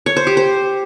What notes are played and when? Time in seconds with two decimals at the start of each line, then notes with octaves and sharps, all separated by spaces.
0.06 C#5
0.16 C5
0.27 G4
0.37 C5